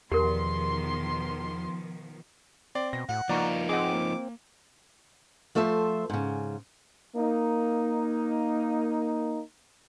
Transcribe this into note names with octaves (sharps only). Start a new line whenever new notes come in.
E2 B2 D#3 F3 G4 A#4 C6
C4 D5
B2 A#6
A2 F#5
F3 A#3 D#4 D5 A#5 C#6
C4 G#4 D#5 F#5 D6
A#3
F3 A3 A4 C5 E5
G#2 C#3
A#3 D#4